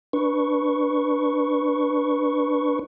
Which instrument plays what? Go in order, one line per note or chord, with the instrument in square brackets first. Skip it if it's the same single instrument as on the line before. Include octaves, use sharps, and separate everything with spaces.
[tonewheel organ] D4 B4 C#6